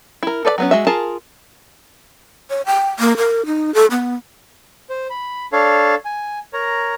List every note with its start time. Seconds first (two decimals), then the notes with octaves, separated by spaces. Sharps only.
0.23 E4 A#4
0.45 A4 B4 D5 E5 B5
0.58 F#3 B3 C#4
0.71 G#3 F#4 E5
0.87 F4 G#4 A#4 A5
2.50 C#5
2.66 G5
2.99 A#3
3.17 A#4
3.46 D#4
3.74 A4
3.91 B3
4.90 C5
5.10 B5
5.52 D4 A4 C#5 F5
6.05 G#5
6.53 A#4 C#5 A#5